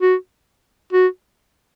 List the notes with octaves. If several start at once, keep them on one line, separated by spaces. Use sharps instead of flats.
F#4
F#4